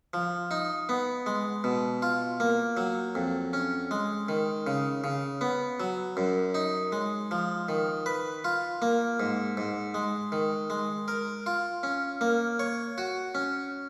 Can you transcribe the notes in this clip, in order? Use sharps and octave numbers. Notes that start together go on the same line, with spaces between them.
F3
D#4
B3
G#3
B2
F4
A#3
F#3
F2
C#4
G#3
D#3
C#3
C#3
B3
F#3
F#2
D#4
G#3
F3
D#3
B4
F4
A#3
G#2
G#2
G#3
D#3
G#3
A#4
F4
C#4
A#3
C#5
F#4
C#4